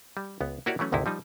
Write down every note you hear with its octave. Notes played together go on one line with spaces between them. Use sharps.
G3
C#2 B3
A#3 E4 F#4 G4 C#5 D5
E3 F#3 A3 C#4
G#1 D2 C3 D#4 E4
F3 G3 D#4